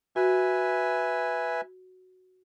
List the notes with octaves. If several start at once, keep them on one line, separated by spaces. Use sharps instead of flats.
F#4 B4 E5 G#5